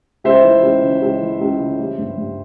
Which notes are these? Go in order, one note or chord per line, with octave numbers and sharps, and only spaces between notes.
C#2 C5 E5
E3
C#2
C#3
C#2
E3
C#2
C#3
G3
G2
G2